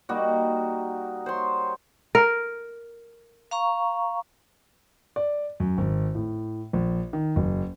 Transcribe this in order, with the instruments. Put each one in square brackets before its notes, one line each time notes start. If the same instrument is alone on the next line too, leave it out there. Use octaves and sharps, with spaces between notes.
[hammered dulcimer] G3 A#3 D#4 F#4
C5 C#5 C6
[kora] A#4
[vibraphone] F5 A#5 C#6
[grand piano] D5
F#2
G#1
A2
A#1
D#3
F#1